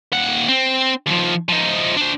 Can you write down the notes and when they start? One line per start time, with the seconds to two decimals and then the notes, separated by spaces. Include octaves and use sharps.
0.12 D#2 F#5
0.48 C4
1.06 D#2 F3
1.49 F3 D#4
1.97 D4 C5